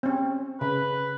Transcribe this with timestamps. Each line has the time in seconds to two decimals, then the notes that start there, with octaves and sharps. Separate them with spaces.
0.03 C4 C#4
0.61 C#3 B4